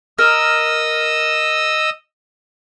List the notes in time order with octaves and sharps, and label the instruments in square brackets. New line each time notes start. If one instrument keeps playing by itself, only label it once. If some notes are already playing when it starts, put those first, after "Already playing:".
[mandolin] A#4 [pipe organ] D#5 E6